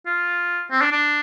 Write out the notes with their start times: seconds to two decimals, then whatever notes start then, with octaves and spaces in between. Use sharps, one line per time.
0.06 F4
0.71 C4
0.81 D4
0.92 D4